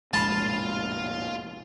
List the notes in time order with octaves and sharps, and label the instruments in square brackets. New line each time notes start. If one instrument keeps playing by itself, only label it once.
[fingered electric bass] F1 A#1 A2 [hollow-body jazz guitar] G#3 B5 [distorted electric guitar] F4 F5 [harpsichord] A5